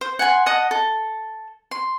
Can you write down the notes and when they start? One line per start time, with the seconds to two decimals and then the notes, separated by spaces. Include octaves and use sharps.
0.01 C5
0.19 F#5 G#5 A5 C6
0.46 D#5 F#5 A5 D#6
0.71 A4
1.71 C6